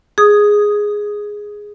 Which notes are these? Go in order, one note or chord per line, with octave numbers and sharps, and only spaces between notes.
G#4 D#6